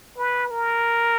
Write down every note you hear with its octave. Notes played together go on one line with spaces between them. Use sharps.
B4
A#4